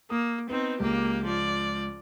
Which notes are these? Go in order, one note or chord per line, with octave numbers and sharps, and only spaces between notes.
A#3 D#6
B3 C4 D#4
C#2 A#3 G4
F3 D5